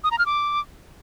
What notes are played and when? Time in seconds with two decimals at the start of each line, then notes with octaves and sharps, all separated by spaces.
0.04 D#6
0.11 A#5
0.19 F6
0.26 D6